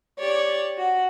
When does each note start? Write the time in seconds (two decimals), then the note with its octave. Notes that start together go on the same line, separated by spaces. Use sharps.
0.19 G4 C#5 D5
0.77 F#4